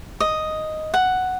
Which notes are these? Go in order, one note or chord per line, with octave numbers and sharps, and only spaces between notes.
D#5
F#5